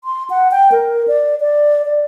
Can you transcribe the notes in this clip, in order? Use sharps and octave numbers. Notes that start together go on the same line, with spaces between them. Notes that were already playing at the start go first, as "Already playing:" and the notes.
C6
F#5
G5
A#4
D5
D5
D5